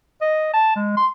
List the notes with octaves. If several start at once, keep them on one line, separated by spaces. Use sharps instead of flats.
D#5
A5
G#3
C6